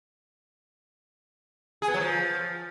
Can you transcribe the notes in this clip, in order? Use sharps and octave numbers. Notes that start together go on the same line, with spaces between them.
G#4
B3
F#3
F3